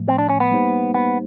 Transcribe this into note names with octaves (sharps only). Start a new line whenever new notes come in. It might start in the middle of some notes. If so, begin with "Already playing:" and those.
Already playing: A2 F3 A3
C4
D4
C#4
B3
G3 A#3 D#4 G4 C5
B3